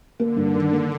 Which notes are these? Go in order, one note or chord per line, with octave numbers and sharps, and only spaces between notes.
D3 A#3
G2
D#3
A#3